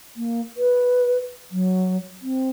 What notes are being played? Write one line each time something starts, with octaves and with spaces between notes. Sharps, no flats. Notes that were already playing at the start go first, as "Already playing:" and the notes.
A#3
B4
F#3
C4